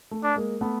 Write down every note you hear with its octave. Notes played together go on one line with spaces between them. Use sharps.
A3
D4
G#3 A#3
A3 B3